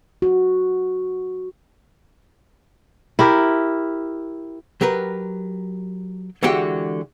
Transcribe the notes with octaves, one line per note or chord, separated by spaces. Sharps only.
F#4
E4 G4 A#4
F#3 G4 A#4 B4
D3 E3 G#3 F#4 G4 G5